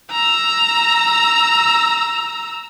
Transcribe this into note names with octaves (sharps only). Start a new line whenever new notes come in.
A#5 E6